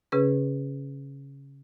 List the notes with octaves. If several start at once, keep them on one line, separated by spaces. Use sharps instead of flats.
C#3 C#4 G#4 B4